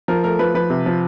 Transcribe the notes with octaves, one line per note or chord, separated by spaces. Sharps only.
F3 A#4
A3 A#4
F3 B4
F3 B4
C3
F3